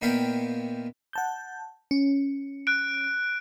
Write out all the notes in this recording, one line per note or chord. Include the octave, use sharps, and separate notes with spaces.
A#2 D#3 B3 E4 F5 G5
F#5 A5 G6
C#4
F#6 D7